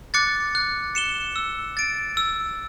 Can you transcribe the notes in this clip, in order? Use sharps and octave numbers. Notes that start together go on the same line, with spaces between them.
D6 F#6 A6 C#7
F#6
C#7 E7 G7
E6
A6 D7
E6